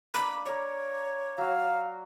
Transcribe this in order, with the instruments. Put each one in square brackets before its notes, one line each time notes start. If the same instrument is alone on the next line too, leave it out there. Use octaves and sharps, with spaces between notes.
[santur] A#3 D4 [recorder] B5
[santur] A#4 D5 [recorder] C#5
[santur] F#3 F#4 [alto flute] F5